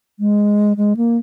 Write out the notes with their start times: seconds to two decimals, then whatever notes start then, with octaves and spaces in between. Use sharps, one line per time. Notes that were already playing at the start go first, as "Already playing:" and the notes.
0.20 G#3
0.77 G#3
0.97 A#3